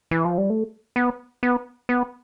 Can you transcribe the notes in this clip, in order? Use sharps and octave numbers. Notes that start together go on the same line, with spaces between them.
E3
F3
G3
A3
B3
B3
B3